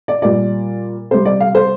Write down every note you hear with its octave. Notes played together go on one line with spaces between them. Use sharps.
D5
A#2 G3 D5
C3 G3 C5
D5
F5
C5